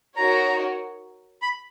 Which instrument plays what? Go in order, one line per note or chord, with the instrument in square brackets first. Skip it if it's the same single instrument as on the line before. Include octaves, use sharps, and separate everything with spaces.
[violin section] D#4 F#4 A#4 C#5 [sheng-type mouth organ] A#5
[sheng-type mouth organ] B5